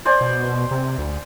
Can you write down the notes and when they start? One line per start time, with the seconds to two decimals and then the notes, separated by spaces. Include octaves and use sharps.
0.05 C5 D5 G#5
0.21 B2
0.71 C3
0.98 D2